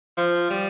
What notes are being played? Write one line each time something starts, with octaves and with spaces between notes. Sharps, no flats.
F3
G3